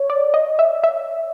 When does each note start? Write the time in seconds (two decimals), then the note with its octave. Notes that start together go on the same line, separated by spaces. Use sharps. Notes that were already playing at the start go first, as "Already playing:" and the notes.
Already playing: C#5
0.10 D5
0.34 D#5
0.59 E5
0.84 E5